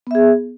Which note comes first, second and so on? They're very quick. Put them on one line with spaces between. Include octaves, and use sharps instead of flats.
B3 E5 G#4